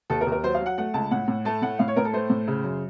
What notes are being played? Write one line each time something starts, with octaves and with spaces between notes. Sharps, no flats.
D#2 A4
A#4
D#2
A#4
F#3 C5
F5
F#3
F#5
A3 F#5
C#2 A5
A2 F#5
A2
A3 A5
A2 F#5
A2 F5
C#5
A2 A#4
A4
A3 C5
A2
C#3
F#2